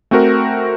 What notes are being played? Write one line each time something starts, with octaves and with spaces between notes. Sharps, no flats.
A3 C4 F#4 A#4